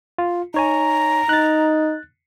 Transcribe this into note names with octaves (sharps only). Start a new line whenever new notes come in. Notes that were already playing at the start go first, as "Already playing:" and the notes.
F4
D#4 C#5 G#5 A#5
D#4 F#6 A6